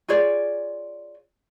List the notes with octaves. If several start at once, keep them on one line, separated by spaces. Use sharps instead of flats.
F4 G#4 C#5 D5